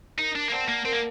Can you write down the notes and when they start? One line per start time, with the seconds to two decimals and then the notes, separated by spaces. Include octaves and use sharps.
0.18 D#4 A#4
0.35 D4
0.48 A#3
0.52 C4 D5 F#5 A5
0.68 A#3
0.85 C4 A#4
0.92 A#3